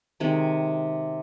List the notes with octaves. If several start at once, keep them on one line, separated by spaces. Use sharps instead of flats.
C3 D#3 G#3